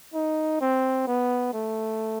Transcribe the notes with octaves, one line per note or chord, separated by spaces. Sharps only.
D#4
C4
B3
A3